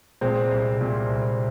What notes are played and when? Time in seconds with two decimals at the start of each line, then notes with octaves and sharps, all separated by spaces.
0.21 A#2 G#3 C4
0.51 C2
0.81 A#2
1.09 C2